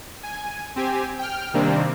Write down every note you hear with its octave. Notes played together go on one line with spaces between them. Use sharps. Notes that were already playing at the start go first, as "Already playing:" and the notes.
G#5
C4 G4 G#5
G5 F6
C3 D#3 G3 A#3 C4 D4